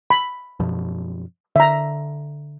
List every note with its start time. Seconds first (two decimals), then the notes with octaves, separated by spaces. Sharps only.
0.10 B5
0.60 F#2 B2 F3
1.56 D3 E5 A#5